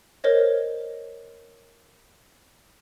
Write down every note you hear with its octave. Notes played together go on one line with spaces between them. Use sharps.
A#4 C5 C#5 D#5